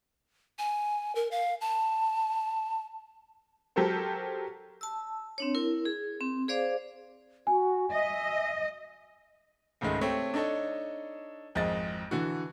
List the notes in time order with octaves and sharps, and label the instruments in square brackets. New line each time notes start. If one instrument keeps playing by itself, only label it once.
[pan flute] G#5
A#4
F5
A5
[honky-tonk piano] F#3 G4 A4 A#4 C5
[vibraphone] A5 E6
C4 D4 C#5
E4 A#4
G#4
C4
G#4 C5 D5 F5 D6
[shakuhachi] F#4 [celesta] G#5
[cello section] D#5 [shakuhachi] E5
[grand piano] C#2 G#2 D#3 G#3 A3
A3 C4 G4 C#5
D4 D#4 A4 C#5 D#5
G#1 F2 G#3 D#5 A6
D3 E3 F#4